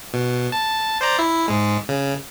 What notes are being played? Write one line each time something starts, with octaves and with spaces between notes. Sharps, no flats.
B2
A5
C5 D5 A#5
E4
G#2 G#3
C#3